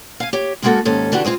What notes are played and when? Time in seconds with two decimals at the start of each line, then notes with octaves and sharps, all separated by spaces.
0.20 F5 G#5
0.33 G4 C#5
0.62 C#3 G#3 A#3 B3 F#4 A4
0.85 D#2 G#2 C#4 A4
1.12 D3 E3 D4 F#4 G4 A4
1.25 G#3 C4 F4 G4 G#4